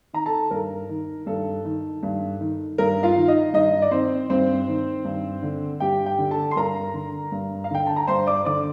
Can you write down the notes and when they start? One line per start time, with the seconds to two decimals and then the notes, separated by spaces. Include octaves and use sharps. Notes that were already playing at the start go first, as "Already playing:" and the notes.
0.13 D#3 A#5
0.26 A4 A5
0.51 G2 A#4
0.89 D#3
1.26 G2 A4
1.65 D#3
2.03 G2
2.41 D#3
2.78 G2 A#4
3.03 F4 F5
3.16 D#3
3.28 D#4 D#5
3.53 G2 D#4 D#5
3.82 D5
3.91 D#3 C4 C5
4.30 G2 C4 C5
4.68 D#3
5.05 G2
5.43 D3
5.80 G2 G4 G5
6.06 G4 G5
6.19 D3
6.31 A4 A5
6.51 C6
6.56 G2 A#4 A#5
6.94 D3
7.32 G2
7.64 F5
7.71 D3 G5
7.87 A5
7.96 A#5
8.07 G2 C5 C6
8.27 D5 D6
8.45 D3 D5 D6